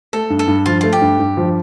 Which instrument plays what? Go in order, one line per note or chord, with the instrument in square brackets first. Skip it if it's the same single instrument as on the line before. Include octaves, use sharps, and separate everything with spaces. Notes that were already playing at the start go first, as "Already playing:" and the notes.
[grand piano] A3 [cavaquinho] A4
[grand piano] G2
[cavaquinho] A4
[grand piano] G2
[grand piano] F3 [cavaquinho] F4
[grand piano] A3 [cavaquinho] F4
[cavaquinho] G4
[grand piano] G2
G2
F3